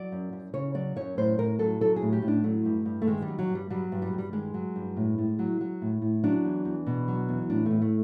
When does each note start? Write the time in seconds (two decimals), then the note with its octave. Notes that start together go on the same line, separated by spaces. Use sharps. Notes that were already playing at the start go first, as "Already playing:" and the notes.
Already playing: F#3 D5
0.12 F#2
0.33 F#2
0.53 C#3 C#5
0.75 F#3 D5
0.96 F#2 C#5
1.18 A2 C5
1.38 A2 A#4
1.59 F#3 A4
1.81 F#3 A4
1.96 G#4
2.02 A2
2.12 G4
2.22 A2
2.28 D4
2.44 F#3 A3
2.65 G2
2.86 G2
3.02 A3
3.07 D#3 G#3
3.22 G3
3.28 F#3
3.39 F#3
3.50 G2
3.55 G3
3.70 F#3 G3
3.92 G2
4.02 G3
4.13 G2
4.18 G3
4.33 D#3 G#3
4.54 F#3
4.76 G2
4.96 A2
5.18 A2
5.39 F#3
5.61 F#3
5.82 A2
6.02 A2
6.24 F#3 D4
6.45 E2
6.65 E2
6.87 B2
7.08 F#3
7.29 E2
7.50 A2 D4
7.66 A2 A3
7.82 A3